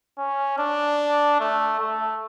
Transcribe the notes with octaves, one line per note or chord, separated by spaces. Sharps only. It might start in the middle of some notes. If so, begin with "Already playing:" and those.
C#4
D4
A3
A3